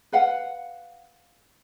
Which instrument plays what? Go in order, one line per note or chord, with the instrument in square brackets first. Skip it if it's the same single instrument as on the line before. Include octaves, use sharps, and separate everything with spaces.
[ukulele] B4 F5 F#5